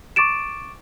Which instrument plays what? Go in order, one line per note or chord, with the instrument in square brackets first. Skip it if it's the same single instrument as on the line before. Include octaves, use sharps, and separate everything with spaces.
[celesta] C#6 D6 A6 D7 E7